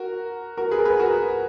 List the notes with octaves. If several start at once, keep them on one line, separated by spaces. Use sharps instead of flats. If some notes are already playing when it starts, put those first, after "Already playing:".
Already playing: F#4 A#4
F#4 A#4
G#4 B4
A#4
G#4 B4
F#4 A#4